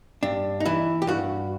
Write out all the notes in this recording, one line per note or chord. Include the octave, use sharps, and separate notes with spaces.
G2 D4
D#4
E3 E4
G4
G2 F#4